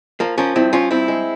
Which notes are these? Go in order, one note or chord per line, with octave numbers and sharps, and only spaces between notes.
F3 A#3
F3 A#3 C#4
G2 C4 E4
F3 C#4 F4
G2 C4 E4
G#3